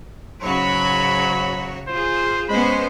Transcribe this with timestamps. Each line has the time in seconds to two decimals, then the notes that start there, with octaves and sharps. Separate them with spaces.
0.42 G#2 C#3 F#3 F#4 C#5 B5
1.88 F4 G#4 C5
2.49 G#3 B3 C#4 C5 B5